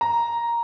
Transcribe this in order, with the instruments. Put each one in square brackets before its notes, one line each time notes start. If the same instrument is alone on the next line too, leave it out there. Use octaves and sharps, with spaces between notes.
[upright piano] A#5